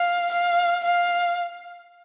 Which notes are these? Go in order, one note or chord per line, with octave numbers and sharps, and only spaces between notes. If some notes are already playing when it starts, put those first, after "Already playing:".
Already playing: F5
F5
F5